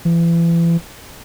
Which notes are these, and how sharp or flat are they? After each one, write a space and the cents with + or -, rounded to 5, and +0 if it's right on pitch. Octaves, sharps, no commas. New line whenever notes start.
E3 +35